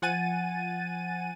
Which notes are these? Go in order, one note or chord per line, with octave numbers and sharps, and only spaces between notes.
F3 F#5 G#5 A6 D#7